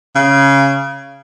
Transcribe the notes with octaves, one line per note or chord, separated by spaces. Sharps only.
C#3